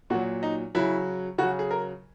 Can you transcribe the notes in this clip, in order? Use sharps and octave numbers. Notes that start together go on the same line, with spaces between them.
A#2 F#3 F#4
D#4
C#3 F#3 E4
C#3 F#3 F#4
G#4
A#4